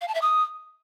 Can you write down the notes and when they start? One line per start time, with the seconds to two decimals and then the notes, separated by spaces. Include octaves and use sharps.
0.01 F5
0.08 A5
0.15 E5
0.22 D#6